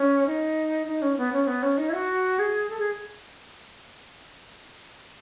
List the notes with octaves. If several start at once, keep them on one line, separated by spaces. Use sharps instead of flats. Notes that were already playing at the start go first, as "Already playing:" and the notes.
Already playing: C#4
D#4
D#4
C#4
B3
C#4
B3
C#4
D#4
E4
F#4
G#4
A4
G#4